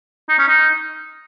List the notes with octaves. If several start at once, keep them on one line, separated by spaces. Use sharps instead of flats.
D#4
C#4
D#4